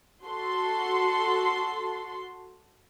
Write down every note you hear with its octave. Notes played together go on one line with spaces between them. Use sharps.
F#4 A4 C6